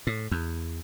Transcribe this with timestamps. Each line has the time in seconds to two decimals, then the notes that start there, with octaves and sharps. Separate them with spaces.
0.07 A2
0.31 E2